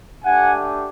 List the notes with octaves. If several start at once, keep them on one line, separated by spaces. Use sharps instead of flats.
A3 D4 G4 F#5 G#5